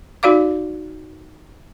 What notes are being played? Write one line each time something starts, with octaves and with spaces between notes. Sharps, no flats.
D#4 F#4 D5 F5 D6